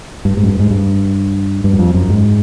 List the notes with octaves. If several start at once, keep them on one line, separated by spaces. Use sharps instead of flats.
G2
G#2
F#2
G2
G#2
G2
G2
F#2
F2
F#2
G#2